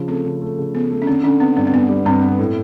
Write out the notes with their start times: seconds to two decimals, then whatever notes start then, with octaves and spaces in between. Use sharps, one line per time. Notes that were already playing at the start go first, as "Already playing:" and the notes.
Already playing: C#3 F3
0.08 A3 C4
0.25 C#3
0.42 A3
0.59 C#3
0.74 A3 B3
0.91 A3
1.02 C#4
1.07 D3 C4
1.23 D3 C#4
1.40 B3 C4
1.57 G2 C4
1.67 C4
1.73 G2 B3
1.89 G3
2.06 G2 C4
2.22 B3
2.39 A2